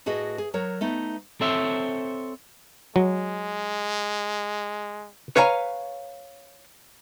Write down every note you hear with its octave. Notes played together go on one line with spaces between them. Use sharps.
A2 F#4 G#4 B4 D#5
G#4
F#3 A#4 C#5
A3 B3 D#4
C4 A4 C5 C#5 E5
F#3 G#3
B4 C#5 F5 G#5 A#5